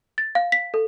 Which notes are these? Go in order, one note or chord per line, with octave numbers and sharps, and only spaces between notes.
A6
F5
B6
A4